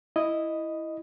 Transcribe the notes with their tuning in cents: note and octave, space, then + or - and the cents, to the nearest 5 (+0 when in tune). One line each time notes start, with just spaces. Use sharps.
E4 +0 D#5 +0